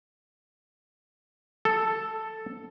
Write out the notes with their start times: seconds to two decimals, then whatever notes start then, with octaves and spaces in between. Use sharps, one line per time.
1.65 A4